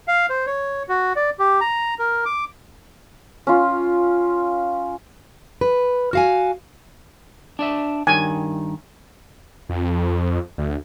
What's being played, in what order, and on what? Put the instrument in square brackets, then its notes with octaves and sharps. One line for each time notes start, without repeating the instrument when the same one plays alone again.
[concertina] F5
C5
C#5
F#4
D5
G4
A#5
A#4
D6
[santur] C#4 F4
[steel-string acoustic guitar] B4
F#4 F5 G#5
[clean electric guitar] D4 D5 E5
[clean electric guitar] G2 D#3 [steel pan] G#5
[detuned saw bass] F2
D2